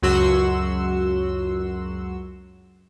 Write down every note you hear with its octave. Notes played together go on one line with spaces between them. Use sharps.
C#2 F#2 F#3 F#4 C6 E6